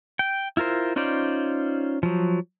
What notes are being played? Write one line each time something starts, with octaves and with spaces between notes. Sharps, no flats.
G5
E4 F4 A#4 C5
C#4 D#4 F4 C5 D5
F3 F#3